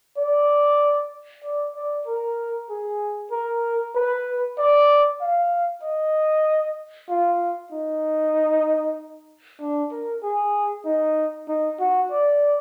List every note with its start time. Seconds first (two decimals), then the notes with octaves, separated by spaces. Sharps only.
0.17 D5
1.44 D5
1.75 D5
2.06 A#4
2.70 G#4
3.31 A#4
3.95 B4
4.58 D5
5.21 F5
5.82 D#5
7.09 F4
7.72 D#4
9.60 D4
9.91 A#4
10.22 G#4
10.85 D#4
11.48 D#4
11.80 F#4
12.11 D5